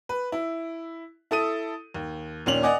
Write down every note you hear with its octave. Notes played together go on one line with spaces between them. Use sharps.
B4
E4
E4 A4 D#6 D#7
D#2
D#2 A#2 C#4 D4 F7 F#7
D5 D#5 F#5 G#5 D6